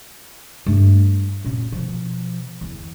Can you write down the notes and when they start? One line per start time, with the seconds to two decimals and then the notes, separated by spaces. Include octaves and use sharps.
0.66 G2 A3
1.45 F#2 A#2
1.72 B2 F3
2.61 E2